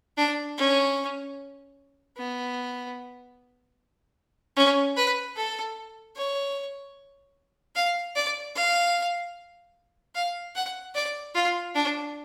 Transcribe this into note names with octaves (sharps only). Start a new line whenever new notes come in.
D4
C#4
B3
C#4
B4
A4
C#5
F5
D5
F5
F5
F#5
D5
F4
D4